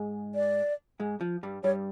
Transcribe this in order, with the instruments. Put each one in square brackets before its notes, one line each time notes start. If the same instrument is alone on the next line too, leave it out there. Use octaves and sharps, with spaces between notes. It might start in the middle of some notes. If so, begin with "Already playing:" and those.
Already playing: [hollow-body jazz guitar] G#2 G#3
[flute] D5
[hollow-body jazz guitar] G#2 G#3
F3
G2 G3
[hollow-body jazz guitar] G2 G3 [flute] C#5